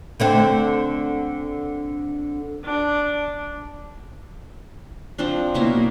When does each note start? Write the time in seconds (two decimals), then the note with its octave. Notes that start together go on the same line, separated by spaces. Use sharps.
0.20 D3 A3 C4
2.65 D4
5.18 F3 C4 D4
5.54 B2 F#3 A#3 B3 E4